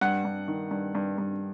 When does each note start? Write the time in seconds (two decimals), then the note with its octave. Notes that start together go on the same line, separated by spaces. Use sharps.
0.01 G2 F#5
0.25 G2
0.48 D#3
0.71 G2
0.95 G2
1.18 G2